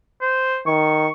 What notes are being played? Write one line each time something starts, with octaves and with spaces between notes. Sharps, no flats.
C5
D#3 C#6